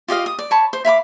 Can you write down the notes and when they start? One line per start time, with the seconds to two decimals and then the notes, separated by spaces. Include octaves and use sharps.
0.08 F4 G4 D#5 F5
0.26 D#6
0.39 D5
0.51 C#5 A5 B5
0.73 C5
0.85 E5 F5 B5 D6